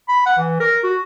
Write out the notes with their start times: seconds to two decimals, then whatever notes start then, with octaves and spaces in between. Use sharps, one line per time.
0.08 B5
0.26 F#5
0.38 E3
0.60 A#4
0.84 F#4